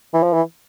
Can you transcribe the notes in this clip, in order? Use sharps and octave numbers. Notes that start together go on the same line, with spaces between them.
E3
F3
E3